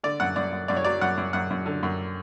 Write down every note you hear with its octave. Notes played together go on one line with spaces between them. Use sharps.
D3 D5
F#2 F#5
F#2 D5
F#2
F#2 D5
C#5
F#3 D5
F#2 F#5
F#2
F#2 F#5
F#2
D3
F#2